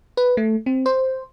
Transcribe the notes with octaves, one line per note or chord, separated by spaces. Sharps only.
B4
A3
C4
C5